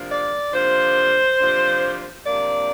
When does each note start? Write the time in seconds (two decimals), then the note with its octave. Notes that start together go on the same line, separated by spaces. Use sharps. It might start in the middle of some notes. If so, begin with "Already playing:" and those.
Already playing: C3 F3 A#3 D4
0.10 D5
0.52 C3 F3 A#3 D4 C5
1.39 C3 F3 A#3 D4
2.26 C3 F3 A#3 D4 D5